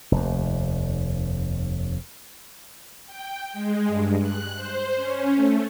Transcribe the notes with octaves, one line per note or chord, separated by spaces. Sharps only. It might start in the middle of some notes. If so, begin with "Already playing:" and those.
F1 D#2
G5
G#3
G2
F#6
C5
C#4
A3